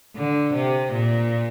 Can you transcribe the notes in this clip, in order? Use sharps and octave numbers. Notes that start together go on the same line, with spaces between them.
D3
C3
A#2